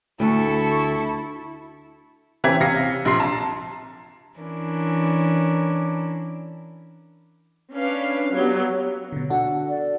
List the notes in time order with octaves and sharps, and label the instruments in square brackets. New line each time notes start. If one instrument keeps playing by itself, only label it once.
[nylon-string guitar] D2 [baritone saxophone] E4 [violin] A4 C#6
[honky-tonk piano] C3 E3 C4 C#4 G#6 B6
C3 F5 A#6 C7 C#7
A#1 C3 C6 C7
A5 A#5
[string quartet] E3 C#4 D4 E4 A#4
[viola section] C#4 D4 B4 F5
F#3 B3 G4
[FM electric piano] B2 D3
[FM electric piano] D4 F#4 A4 [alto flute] F#5
[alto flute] D5